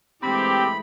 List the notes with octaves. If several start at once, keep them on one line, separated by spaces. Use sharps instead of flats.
G2 E3 G#3 A3 C4 G4 B5